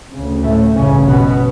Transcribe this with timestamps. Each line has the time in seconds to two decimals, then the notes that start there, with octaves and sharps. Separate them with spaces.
0.12 D2 C#3
0.43 A2 A3
0.75 A1 G2 C#3 C#4
1.07 B2 B3